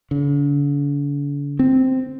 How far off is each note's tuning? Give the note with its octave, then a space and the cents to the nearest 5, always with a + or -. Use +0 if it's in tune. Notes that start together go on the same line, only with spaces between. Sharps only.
D3 -45
C4 -5